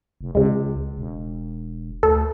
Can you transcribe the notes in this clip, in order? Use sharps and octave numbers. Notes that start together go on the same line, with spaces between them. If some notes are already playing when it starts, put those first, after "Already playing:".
F1
C#2 C#3 G#3
E1
D2 A4